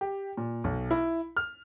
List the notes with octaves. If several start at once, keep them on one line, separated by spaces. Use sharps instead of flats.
G4
A#2
B1
E4
F6